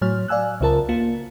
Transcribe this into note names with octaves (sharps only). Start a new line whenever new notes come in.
A2 F#3 C#5 F6
D5 F5 G#5 E6 F#6
C#2 C#3 F4 A#4 A5
A#3 F4